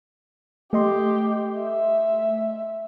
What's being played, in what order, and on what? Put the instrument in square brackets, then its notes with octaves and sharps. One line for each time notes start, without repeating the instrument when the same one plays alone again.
[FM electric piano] A3 D#5 C6 [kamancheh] G4
[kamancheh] E5